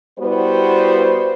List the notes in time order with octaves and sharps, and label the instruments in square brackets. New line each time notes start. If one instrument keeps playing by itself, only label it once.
[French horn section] G3 B3 E4 F#4 B4 C5